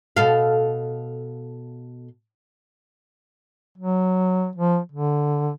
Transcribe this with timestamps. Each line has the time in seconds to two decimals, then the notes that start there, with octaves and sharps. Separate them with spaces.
0.17 B2 A4 F5
3.78 F#3
4.56 F3
4.92 D3